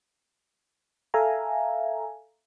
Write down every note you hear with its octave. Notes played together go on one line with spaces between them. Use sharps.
A4 E5 F5 G#5 A#5